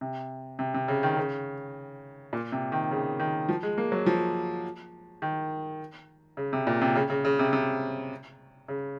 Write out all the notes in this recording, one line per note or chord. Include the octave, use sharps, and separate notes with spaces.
C3
C3
C3
C#3
D#3
C#3
A#2
C3
D#3
C#3
D#3
F3
G#3
A#3
F#3
F3
D#3
C#3
C3
A#2
C3
C#3
C#3
C#3
C3
C3
C#3